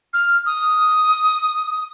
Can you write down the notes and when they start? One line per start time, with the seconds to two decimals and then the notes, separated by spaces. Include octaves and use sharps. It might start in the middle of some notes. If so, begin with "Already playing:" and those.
0.13 F6
0.46 D#6